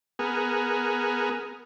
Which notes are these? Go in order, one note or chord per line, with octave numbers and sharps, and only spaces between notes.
B3 G#4 A#4